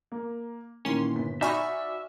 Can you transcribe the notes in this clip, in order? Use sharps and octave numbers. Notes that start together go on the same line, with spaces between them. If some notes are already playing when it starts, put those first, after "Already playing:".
A#3
A#2 D#3 E3 A#3 C#4 C6
G1 B3 B6
D#4 F#4 D5 E5 G#5 B5 C#6 F6